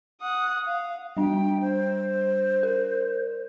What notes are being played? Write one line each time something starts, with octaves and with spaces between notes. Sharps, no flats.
F#5 D#6
F5
G3 D4 G5
C5
A#4